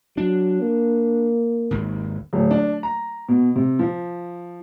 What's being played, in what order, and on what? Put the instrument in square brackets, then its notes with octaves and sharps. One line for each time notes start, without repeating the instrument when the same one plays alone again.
[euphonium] F#3 [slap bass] D4
[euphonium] A#3
[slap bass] G#1 D#2
[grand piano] D1
D4
A#5
B2
C3
F3